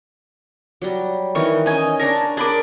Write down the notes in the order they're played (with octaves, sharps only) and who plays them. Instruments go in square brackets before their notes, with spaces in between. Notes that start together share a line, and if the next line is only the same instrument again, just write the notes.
[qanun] F#3 G3
[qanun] D#3 E3 A#4 [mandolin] C#6
[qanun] C#4 D#4 [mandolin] D#5 G#5
[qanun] D4 C#5 A5 [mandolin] A#4
[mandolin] D4 B5 D6 [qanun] G#4 A#4